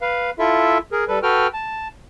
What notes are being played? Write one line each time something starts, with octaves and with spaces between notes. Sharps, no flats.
B4 F5
E4 F4 A4 E5
G#4 A#4
G3 A4 B4
F#4 A4 B4 G5 F6
A5